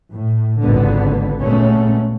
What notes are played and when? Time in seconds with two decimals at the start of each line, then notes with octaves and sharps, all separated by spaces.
0.13 A2
0.60 G#1 C#2 D3 B3
1.41 A#2 G#3 A3 B3 C#4